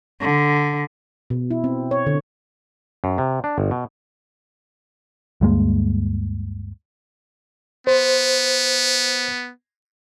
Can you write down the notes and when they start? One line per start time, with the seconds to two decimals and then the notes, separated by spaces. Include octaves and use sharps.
0.22 D3
1.30 B2
1.51 E4
1.64 C4
1.91 C#5
2.07 D3
3.04 F#2
3.18 C3
3.44 D4
3.58 G1
3.71 B2
5.41 D2 G2 G#3 A#3
7.87 B3 C5